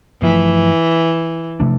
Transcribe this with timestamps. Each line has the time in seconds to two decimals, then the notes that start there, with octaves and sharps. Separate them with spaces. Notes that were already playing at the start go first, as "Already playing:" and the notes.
0.22 G2 E3 F3 A3
1.60 C3 F3 A3 D4